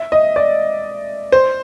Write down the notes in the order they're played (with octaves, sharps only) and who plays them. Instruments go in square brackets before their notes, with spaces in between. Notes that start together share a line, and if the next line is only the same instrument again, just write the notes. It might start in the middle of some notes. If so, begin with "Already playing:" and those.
Already playing: [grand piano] E5
D#5
D5
C5